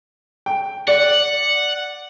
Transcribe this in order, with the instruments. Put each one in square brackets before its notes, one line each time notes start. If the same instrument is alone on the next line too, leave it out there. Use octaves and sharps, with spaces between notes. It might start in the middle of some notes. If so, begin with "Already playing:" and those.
[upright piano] G5
[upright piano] D5 [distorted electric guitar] F#5